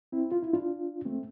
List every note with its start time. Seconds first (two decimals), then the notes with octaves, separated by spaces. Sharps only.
0.12 C4 E4
0.32 F4
0.43 E4
0.53 D4 F4
1.05 A3 C4